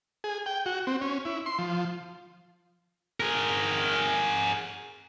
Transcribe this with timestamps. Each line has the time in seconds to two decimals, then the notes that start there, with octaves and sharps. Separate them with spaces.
0.24 G#4
0.46 G5
0.66 F#4
0.87 C4
1.01 C#4
1.25 E4
1.46 C6
1.59 F3
3.20 G#4 A#4